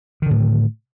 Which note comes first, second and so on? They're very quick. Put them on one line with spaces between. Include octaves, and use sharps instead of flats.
D#3 D3 A2